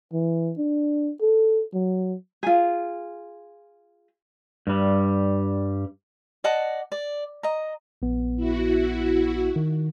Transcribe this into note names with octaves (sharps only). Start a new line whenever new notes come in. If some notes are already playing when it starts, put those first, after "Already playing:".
E3
D4
A4
F#3
F4 G#4
G2 G3
D5 D#5 F#5 A5
D5
D#5 A#5
A#1 B3
E4 F#4
D#3